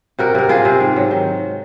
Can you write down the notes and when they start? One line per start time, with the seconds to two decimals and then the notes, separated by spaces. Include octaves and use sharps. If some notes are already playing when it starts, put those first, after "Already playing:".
0.19 C3 F#4 A#4
0.35 C3 A#4
0.49 C3 F4 G#4
0.65 C3
0.80 G#2
0.96 F#3
1.11 D#3